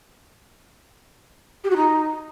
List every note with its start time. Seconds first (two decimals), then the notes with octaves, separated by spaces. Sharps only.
1.64 G4
1.70 F#4
1.77 D#4